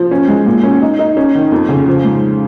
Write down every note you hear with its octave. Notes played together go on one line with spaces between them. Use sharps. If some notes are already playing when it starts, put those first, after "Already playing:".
Already playing: F3
C#4
G#3
A#2
C#4
D#4
D#4
C#4
D#3
F2
C#3
F3
G#2